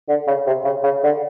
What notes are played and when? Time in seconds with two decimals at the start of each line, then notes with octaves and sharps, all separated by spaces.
0.08 D3
0.27 C#3
0.46 C3
0.65 C#3
0.83 C#3
1.03 D3